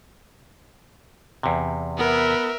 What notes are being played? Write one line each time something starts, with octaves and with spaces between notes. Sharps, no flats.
E2 C3
B3 A#4 E5